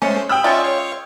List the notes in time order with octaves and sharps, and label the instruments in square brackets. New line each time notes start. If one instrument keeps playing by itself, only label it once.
[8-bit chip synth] G#3 A3 C5 [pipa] C#4
[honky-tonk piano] G5 D#6 E6 [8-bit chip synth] B5
[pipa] G#3 C#4 F4 [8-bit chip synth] D5 E5 C#6
[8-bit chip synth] C#5 F5